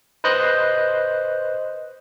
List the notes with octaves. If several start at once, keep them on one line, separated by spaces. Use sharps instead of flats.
B4 C5 D#5 F#6 G6